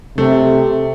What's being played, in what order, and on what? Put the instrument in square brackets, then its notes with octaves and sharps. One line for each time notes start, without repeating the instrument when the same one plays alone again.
[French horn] C3 [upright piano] A3